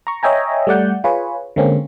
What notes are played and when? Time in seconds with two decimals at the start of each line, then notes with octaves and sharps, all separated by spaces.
0.07 A#5 C#6
0.23 C#5 D#5 E5 G5 G#5 A#5
0.67 G3 A3 D5 F#5 G6
1.04 F4 G#4 B4 C#5
1.56 D3 G#3 A#3 C4 C#4